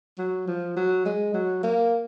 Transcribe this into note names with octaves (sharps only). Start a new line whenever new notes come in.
F#3
F3
F#3
G#3
F#3
A#3